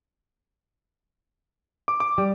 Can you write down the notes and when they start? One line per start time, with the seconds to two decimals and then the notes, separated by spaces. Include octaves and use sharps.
1.88 D6
2.00 D6
2.18 G3